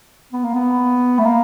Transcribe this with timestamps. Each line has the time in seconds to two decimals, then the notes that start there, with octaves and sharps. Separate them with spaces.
0.33 B3
0.44 A#3
0.55 B3
1.19 A3
1.25 A#3